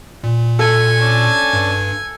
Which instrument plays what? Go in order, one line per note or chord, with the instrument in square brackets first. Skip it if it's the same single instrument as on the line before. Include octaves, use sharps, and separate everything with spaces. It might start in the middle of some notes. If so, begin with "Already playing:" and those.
[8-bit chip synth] A#2
[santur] A4 [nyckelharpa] G#5
[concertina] C#4 D4 A5
[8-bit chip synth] G2